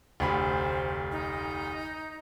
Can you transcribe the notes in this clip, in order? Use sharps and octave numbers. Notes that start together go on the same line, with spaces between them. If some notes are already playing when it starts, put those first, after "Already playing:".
F1 D2 C5 B5
D#4